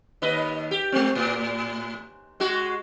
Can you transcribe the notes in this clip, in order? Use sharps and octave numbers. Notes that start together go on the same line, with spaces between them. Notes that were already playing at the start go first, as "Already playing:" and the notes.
D#2 B4 D#5
G4
G#3 C4
A2
G#3 F#4